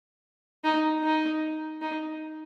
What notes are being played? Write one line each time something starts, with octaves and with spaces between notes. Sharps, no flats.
D#4
D#4
D#4